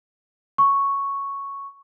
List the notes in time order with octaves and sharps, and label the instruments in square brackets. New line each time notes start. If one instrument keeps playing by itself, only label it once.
[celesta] C#6